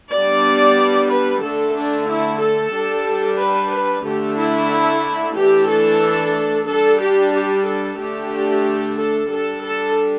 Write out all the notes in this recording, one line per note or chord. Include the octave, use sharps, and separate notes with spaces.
G3 B3 D4 D5
B4
D3 A3 D4 A4
D4
E4
A4
G3 D4
B4
B4
D3 A3 D4 G4
E4
E3 A3 D4 G4
A4
G3 D4 A4
G4
G4
A4
D3 A3 D4 G4
A4
G3 D4 A4
A4